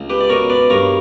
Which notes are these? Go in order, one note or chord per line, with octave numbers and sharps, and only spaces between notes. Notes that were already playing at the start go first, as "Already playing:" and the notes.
Already playing: C#2
G4 B4
D5
B2 A#4 C#5
B4 D5
G2 A#4 C#5